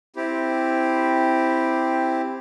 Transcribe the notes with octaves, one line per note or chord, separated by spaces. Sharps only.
C4 E4 G4